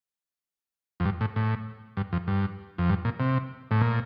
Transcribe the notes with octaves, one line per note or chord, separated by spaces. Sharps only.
F2
G2
A2
A2
G2
F2
G2
F2
G2
A#2
C3
A2
A#2